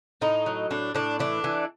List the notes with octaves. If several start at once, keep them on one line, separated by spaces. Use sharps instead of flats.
A2 D#4
F#3
A2 D4
A2 D4
E3 D4
E3